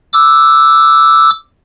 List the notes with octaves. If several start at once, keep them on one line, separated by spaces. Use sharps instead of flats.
D6 E6